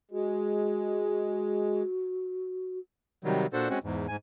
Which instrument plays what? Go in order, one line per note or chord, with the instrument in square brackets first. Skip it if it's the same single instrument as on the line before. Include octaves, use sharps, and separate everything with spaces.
[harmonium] G#3 [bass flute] F#4
[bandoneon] C3 D#3 F#3 G3
A#2 D4 F#4 A4 C5
G#3 C4 C#4 F#4
E2 G#2
G#2 G#5